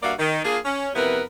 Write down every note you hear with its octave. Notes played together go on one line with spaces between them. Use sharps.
G2 A#3 F#4 D5 E5 F5
D#3
A#3 D4 F4 G#4
C#4
F2 C3 B3 E4 A#4 B4